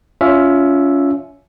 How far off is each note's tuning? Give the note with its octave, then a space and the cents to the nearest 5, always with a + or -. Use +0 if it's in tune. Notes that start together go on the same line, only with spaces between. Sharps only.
C#4 +25 F4 +0 E5 +0